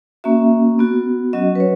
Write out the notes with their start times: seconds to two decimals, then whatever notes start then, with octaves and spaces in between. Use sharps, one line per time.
0.24 A#3 C#4 F#4 E5
0.79 B3 F#4
1.33 F#3 C#4 F#4 D#5
1.55 B4
1.60 C#5